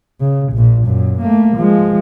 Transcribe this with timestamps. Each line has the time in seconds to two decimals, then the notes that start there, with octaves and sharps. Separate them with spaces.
0.21 C#3
0.53 A#1 A#2
0.85 F#2 A#2
1.22 A3 A#3
1.56 F3 G#3